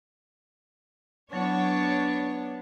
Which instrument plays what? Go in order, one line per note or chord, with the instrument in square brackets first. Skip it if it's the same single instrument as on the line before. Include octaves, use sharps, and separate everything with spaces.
[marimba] F#3 E4 F#5 [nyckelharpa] B3 [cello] D4 [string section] C#5